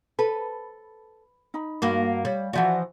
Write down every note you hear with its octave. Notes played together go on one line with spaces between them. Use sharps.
A4 B4
D#4 B5
G2 A#3 F#4
G3 C#5 D5
E3 F3 F#4 D5 E5 F#5